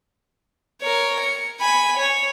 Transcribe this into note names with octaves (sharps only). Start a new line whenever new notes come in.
A#4 C#5
C#7
G#5 B5
C#5